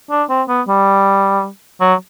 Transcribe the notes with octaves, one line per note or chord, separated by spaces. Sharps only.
D4
C4
B3
G3
F#3